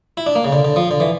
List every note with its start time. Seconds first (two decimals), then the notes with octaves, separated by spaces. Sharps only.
0.17 E4
0.26 D4
0.35 A#3
0.45 C#3
0.53 D3
0.65 D3
0.76 F3
0.91 D3
1.00 E3